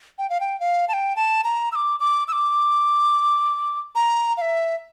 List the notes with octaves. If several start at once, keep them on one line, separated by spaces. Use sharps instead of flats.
G5
F5
G5
F5
A5
G5
A5
A#5
E6
D6
D6
E6
D6
A#5
F5
E5